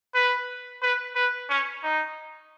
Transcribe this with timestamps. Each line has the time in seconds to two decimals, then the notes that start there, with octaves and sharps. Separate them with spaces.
0.14 B4
0.82 B4
1.16 B4
1.49 C#4
1.83 D#4